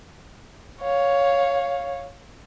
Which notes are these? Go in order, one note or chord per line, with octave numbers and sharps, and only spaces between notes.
C#5 F5